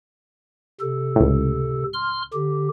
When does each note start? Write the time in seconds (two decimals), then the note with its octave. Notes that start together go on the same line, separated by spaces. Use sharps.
0.81 C3 A4
1.16 C#2 A2
1.94 C6 F6
2.34 D3 G4